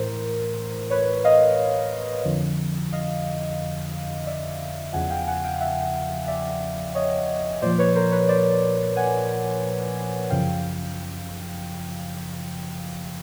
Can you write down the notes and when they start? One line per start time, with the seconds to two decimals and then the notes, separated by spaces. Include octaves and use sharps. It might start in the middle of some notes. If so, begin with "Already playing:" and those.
Already playing: A2 E3 A#4 C5
0.90 B4 C#5
1.24 D#5 F5
2.25 F2 D3 F3
2.92 D#5 F5
4.27 D5 E5
4.93 E2 C#3 F3 F#5 G#5
5.10 F5 G5
5.27 F#5 G#5
5.44 F5 G5
5.60 E5 F#5
6.28 D5 E5
6.95 C#5 D#5
7.62 A#2 F3 C5 D5
7.78 B4 C#5
7.96 A#4 C5
8.12 B4 C#5
8.29 C5 D5
8.96 F#5 G#5
10.30 F#2 C#3 F3 F5 G5